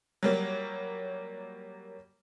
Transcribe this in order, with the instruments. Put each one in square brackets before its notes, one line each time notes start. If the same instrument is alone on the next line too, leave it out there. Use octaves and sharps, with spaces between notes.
[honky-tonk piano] F#3 G3 A#3